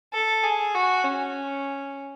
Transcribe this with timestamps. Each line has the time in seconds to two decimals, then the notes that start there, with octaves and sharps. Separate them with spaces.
0.14 A4
0.44 G#4
0.75 F#4
1.04 C#4